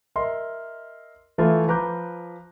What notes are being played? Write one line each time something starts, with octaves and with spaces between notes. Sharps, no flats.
A#4 D#5 E5 C6
E3 A3 E4 F4
F3 B4 A#5 D6 G6